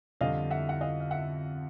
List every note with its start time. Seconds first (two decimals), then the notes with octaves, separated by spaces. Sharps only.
0.21 F2 D3 G3 C4 D#5 F5
0.51 E5 F#5
0.69 F#5
0.81 D#5 F5
1.00 F5
1.11 E5 F#5